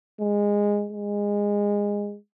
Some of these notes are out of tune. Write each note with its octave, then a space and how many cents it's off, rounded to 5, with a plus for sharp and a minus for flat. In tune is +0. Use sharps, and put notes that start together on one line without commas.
G#3 -15
G#3 -20